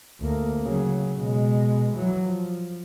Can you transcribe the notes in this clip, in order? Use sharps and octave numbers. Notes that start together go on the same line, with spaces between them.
D2 A#3
C#3 F#3
B2 G#3
E3 F#3
F3